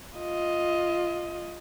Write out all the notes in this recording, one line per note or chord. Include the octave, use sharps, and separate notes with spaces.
F4 D#5